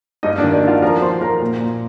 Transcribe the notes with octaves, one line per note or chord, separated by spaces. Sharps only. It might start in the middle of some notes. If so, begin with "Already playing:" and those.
G2 D#4 D#5
D4 D5
D#3
D4 D5
D#3 F4 F5
F3 A#4 A#5
F3 C5 C6
F3 A#4 A#5
A#2
A#2